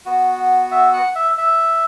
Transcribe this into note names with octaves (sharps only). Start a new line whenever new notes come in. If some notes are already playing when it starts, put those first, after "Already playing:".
B3 F#4
E5
F#5
E5
E5